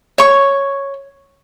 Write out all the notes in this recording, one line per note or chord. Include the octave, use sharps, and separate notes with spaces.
C#5 C#6